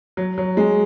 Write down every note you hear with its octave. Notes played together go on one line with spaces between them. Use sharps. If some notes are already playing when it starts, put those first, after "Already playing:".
F#3
F#3
G#3